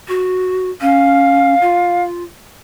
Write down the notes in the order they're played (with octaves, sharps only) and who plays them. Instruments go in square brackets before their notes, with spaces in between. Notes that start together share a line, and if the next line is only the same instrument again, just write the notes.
[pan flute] F#4
[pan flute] C#4 [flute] F5
[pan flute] F4